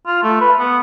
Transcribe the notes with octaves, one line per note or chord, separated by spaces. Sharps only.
F4
A3
B4
B3